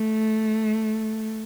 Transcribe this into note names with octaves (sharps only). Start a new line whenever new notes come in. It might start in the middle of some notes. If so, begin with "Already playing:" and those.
Already playing: A3